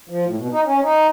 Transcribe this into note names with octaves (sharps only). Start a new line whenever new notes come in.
F3
A2
B2
D#4
C#4
D#4